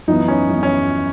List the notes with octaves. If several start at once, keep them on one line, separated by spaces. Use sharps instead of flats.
F#2 E3 B3 D#4
C#4
F#2 E3 B3
C#4